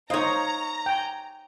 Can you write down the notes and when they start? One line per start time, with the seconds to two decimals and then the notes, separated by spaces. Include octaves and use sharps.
0.10 D#4 C5 C#5 D#5 F5 A#5
0.86 G5 G#5